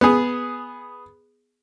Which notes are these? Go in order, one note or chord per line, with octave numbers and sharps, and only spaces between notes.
B3 G#4